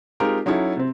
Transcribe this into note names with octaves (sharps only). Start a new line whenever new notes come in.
G#3 C4 D#4 F4 G4 A#4
F#3 C#4 D#4 E4 A4
C3 C4